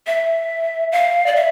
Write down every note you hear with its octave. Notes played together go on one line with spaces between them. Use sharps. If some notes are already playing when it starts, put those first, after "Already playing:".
E5
F5
D5
E5